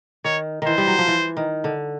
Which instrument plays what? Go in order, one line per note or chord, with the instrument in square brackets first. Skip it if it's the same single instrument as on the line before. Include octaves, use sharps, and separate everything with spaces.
[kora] D#3 [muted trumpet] C#5
[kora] D#3 E3 [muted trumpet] C5
[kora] G3
F#3
F3
E3
D#3
D3